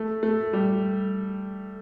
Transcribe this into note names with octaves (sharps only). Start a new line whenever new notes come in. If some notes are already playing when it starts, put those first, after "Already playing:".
Already playing: A3
A3
G3